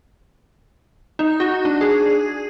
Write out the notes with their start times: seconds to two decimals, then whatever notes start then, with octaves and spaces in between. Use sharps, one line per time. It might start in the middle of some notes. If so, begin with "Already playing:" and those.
1.19 D#4
1.40 F#4
1.65 D4
1.81 G#4